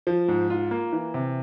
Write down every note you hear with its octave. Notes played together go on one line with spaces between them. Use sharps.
F3
G#2
F4
A#3
E3
C3